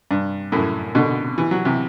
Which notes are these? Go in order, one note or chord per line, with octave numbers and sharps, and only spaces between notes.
G2
F#2 A2
B2 D3
E3
F#3
C3 E3